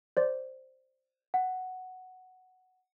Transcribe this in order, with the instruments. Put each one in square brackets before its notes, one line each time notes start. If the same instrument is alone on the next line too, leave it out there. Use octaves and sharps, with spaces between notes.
[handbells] C5 D5
[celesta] F#5